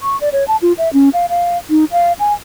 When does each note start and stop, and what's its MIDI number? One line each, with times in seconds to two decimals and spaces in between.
0.02 0.19 85
0.21 0.29 74
0.32 0.46 73
0.48 0.56 81
0.62 0.73 65
0.78 0.92 76
0.93 1.09 61
1.13 1.26 77
1.29 1.58 77
1.70 1.85 63
1.92 2.13 77
2.20 2.33 80